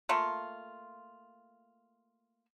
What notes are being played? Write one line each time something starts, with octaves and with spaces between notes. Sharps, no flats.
A3 A#3 F4